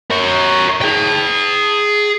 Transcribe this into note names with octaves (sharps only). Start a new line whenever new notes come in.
A#4 C#5
G#4 G5